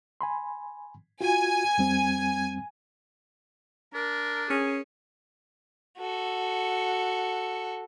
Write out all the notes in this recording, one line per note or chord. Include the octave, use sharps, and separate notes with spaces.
G#5 B5 C6
F4 F#4 G#5
F2 G3 C4
D4 A#4
C#4 G#4
F#4 A4